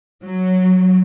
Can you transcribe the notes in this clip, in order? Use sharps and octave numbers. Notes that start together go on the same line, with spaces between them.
F#3